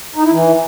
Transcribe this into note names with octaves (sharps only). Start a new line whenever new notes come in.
D#4
E4
E3